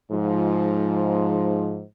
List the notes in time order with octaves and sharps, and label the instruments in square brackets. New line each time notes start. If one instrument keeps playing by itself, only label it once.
[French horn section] G#2 F3